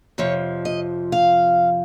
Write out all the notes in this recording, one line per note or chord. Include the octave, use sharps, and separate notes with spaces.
F2 C3 F3 C#5
D#5
F5